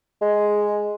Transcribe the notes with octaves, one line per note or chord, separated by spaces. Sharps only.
G#3